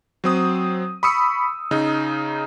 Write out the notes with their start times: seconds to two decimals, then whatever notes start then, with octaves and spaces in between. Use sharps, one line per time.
0.24 F#3 C4 D#6
1.03 B5 C#6 D#6 E6 C#7
1.71 C#3 D#4